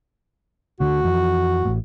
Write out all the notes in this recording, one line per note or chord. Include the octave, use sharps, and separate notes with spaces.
D2 D3 F#4
F2 E3
A1 A2